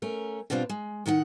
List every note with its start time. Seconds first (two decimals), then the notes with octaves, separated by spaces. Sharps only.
0.02 A3 C#4 A#4
0.50 B2 G3 C4 D4 F4
0.69 G#3
1.06 A2 D#3 D#4 F#5